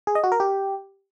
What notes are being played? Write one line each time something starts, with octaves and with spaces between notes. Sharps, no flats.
G#4
D#5
F#4
A#4
G4